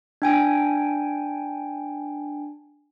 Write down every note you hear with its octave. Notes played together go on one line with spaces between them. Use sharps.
D4 G5 G#5